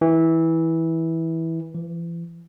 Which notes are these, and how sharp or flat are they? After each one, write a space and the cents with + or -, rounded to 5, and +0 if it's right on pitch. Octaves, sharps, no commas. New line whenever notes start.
E3 -15
E3 +40